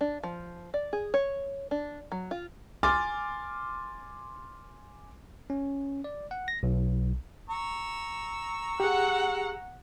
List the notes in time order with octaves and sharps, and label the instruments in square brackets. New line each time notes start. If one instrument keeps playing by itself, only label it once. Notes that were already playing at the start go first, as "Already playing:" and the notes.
[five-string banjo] D4
F3
D5
G#4
C#5
D4
F#3
F4
[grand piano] G#5 C6 D6 F6 A6
[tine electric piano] C#4
D5
F#5
A#6
B1
[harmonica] A#5 C#6 E6
[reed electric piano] G4 G#4 [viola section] F#5